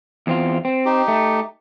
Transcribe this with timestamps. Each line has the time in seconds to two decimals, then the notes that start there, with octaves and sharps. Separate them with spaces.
0.27 E2 C4 F4
0.65 C4
0.85 D#4 G4
1.08 A3